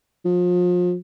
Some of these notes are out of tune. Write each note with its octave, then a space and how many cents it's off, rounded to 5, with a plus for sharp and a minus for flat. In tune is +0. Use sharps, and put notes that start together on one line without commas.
F3 +35